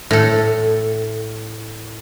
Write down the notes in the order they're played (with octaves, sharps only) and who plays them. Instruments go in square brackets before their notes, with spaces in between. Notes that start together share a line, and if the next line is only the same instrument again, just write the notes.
[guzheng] A2 A4